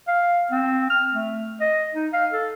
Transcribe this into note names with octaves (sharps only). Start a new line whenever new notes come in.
F5
C4
F6
A3
D#5
D#4
F5
A4